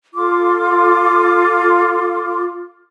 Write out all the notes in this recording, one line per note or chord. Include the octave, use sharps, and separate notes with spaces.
F4 A4 C6 D6